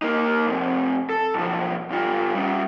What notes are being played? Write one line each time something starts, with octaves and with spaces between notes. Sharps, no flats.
A#3 D#4
F2 C3
A4
B1 F3
G2 F4
G3 C#4